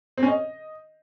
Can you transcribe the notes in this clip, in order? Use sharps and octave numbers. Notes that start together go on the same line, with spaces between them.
C4
C#4
D#5